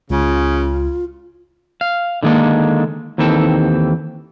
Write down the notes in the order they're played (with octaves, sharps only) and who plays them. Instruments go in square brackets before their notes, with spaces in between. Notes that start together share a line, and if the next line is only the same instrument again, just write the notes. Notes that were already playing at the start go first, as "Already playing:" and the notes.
[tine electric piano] C#2 [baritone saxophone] C#3 [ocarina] F4
[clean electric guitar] F5
D3 D#3 G#3 A#3 A4
D#2 D#3 E3 C4 A4